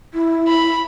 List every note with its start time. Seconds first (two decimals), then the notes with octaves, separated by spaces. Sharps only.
0.14 E4
0.48 B5